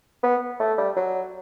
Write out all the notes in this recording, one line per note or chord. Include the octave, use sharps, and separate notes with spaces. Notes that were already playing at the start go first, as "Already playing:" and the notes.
B3
A3
G3
F#3